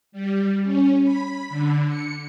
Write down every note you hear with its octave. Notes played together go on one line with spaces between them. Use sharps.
G3
C#4
B5
D3
C#7